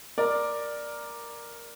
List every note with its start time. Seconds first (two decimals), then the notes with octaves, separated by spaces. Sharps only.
0.18 A#4 D5